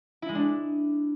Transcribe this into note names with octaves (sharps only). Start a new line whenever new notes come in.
E4
G#3
D4